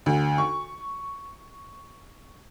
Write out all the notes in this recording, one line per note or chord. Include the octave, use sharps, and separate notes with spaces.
D2
C#6